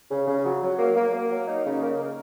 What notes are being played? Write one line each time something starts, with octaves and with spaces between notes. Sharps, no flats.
C#3
C#3
F#3
F#3
A#3
A#3
A#3
F#3
D#4
C#3
A#3
A#4